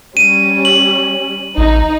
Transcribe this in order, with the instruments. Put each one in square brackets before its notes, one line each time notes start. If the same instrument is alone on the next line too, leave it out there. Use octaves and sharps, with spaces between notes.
[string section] G3 C#4 [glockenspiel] D#7
[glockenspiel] F#7
[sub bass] A1 [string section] D#4